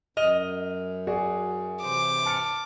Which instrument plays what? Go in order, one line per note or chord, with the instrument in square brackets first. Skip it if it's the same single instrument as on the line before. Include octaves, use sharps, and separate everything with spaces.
[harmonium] F#2 [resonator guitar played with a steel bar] D#5 [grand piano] F6 F7 G7
[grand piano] F#4 G#4 D5
[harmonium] C3 E3 C5 [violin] D6
[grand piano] A5 F6 C#7